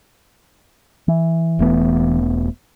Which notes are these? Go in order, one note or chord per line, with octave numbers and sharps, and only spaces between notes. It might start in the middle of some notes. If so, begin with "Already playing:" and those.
E3
E1 A3 B3